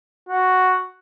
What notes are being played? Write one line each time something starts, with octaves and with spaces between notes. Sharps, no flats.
F#4